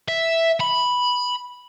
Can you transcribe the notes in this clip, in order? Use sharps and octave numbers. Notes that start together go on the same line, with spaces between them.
E5
B5